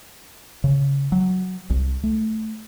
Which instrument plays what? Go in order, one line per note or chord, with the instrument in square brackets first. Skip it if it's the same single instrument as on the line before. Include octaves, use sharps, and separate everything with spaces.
[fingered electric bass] C#3
F#3
C2
A3